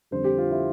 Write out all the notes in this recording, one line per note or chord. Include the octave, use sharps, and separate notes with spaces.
F2 D3 G3 C5
G4
F4
E4